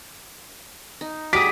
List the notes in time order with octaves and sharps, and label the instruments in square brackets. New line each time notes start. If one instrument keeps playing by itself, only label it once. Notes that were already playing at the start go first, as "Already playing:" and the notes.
[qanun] D#4
[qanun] G3 F#4 G#4 [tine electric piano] D6 D#6 [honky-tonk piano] B6